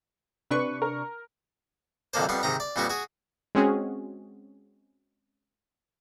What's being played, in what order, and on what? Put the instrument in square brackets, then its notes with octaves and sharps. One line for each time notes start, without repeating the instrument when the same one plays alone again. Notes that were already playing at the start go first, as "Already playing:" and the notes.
[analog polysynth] C3 D4 C#6 [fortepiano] B4 B5
[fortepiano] A#4
[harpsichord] B1 F2 D#3 A#3 D4 C5
F2 G3 B3 C6
G#2 C3 D#3 A#5
D5
F2 A#2 G3 B3 F#4 G4
F#4 G#4
[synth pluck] G#3 C4 C#4 F#4 G#4